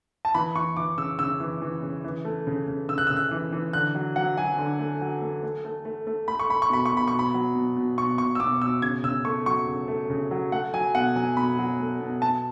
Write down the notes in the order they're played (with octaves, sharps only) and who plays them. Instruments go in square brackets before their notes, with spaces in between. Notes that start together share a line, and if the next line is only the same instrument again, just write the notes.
[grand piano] A5
E3 B5
E3 C#6
E3 D6
C#3 E6
C#3 E6
E3
E3
C#3
E3
A3
C#3
C#3
C#3 E6
F#6
E6
C#3
F#6
E3
E3
D3 F#6
F#3
F#3 F#5
F#3 G#5
D3
A3
F#3
A3
A3
A3
A3
A3
A3 B5
C#6
A3 B5
C#6
B2 B5
C#6
B2 B5
B2 C#6
B5
F#3
B2
B2
B2 C#6
B2 C#6
E6
B2 D6
B2 E6
C#3 G#6
C#3 E6
A3 C#6
F#3 C#6
C#3
A3
C#3
F#3
A3 F#5
F#3 G#5
B2 F#5
F#3 G#5
B2 B5
F#3
A3
B2
B2 A5